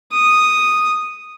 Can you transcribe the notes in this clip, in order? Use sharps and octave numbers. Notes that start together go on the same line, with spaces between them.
D#6